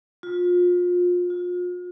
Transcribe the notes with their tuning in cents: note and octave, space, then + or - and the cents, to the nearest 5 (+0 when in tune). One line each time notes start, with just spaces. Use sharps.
F4 +30
F4 +40